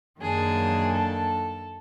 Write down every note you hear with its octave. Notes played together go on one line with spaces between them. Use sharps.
F#2 D#3 F#3 A#3 D4 G#4
A4